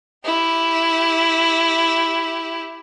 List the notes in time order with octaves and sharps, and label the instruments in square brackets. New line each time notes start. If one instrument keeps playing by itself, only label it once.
[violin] E4 G4